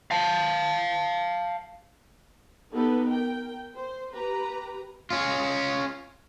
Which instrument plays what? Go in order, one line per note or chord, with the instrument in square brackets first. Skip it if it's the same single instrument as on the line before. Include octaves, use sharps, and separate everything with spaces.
[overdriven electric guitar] F5 A5
[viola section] B3 D#4 G4 A4 B4
A#4 G5
C5
G4 B4 A#5
[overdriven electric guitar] C#4 F4